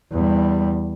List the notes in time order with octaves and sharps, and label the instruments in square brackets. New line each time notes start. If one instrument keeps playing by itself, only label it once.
[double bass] E2 G3